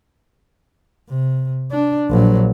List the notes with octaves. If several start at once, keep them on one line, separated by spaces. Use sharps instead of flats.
C3
D4
A#1 F#3